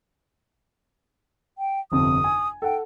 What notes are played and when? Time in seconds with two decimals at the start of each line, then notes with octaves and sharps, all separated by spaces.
1.58 G5
1.92 G1 F2 C3 D#6
2.24 G#5
2.62 A4 F#5 G5